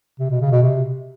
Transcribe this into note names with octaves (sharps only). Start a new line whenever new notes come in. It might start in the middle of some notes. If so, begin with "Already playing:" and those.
C3
B2
C#3
B2
C3